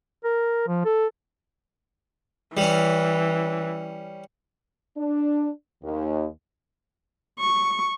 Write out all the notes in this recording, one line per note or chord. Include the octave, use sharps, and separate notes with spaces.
A#4
F3
A4
E3 G3 C#4
D4
D#2
C#6